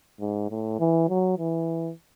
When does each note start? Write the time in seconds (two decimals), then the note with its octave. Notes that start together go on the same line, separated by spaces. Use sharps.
0.20 G#2
0.50 A2
0.80 E3
1.09 F#3
1.39 E3